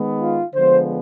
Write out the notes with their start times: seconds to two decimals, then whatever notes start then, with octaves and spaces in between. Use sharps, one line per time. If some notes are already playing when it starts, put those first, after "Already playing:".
Already playing: D#3 G#3 B3
0.20 F4
0.54 D3 F3 G#3 B3 C5